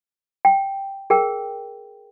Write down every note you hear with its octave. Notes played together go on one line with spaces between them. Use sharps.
G5
G#4 A#4 G5